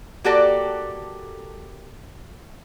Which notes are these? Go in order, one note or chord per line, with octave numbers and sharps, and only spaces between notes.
A#3 F#4 G4 A4 D5